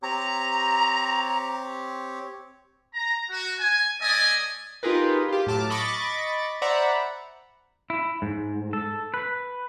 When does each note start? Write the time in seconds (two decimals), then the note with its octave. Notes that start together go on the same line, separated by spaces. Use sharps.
0.02 C4 G4 C#5 A#5
2.93 A#5
3.29 F#4
3.59 G#5
4.00 A3 D5 D#5 G#5
4.83 D#4 F4 G4 G#4 A#4 B4
5.29 F4 G4
5.46 A2 F#3 A5 D6 F6
5.70 D#5 B5 C#6 D6 A6
6.62 C5 D5 E5 F#5 A#5 B5
7.90 E4
8.22 G#2
8.73 A4
9.14 B4